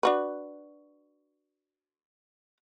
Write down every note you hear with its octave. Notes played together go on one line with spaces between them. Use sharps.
D4 F#4 B4